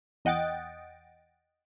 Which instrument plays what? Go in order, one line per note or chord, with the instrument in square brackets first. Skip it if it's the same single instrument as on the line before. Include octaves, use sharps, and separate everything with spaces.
[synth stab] E2 D#5 F#5 G5 A6 D7